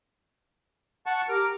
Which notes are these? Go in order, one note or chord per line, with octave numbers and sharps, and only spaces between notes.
F#5 A5 C#6
G4 A#4 D6 F6